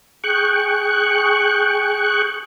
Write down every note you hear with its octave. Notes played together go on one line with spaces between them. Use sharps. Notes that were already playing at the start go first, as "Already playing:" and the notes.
G#4 G5 C#6 F#6